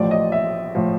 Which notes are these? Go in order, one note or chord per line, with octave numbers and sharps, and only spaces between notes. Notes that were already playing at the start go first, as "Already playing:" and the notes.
Already playing: A1 A2 F3 D5
D#5
E5
A2 F3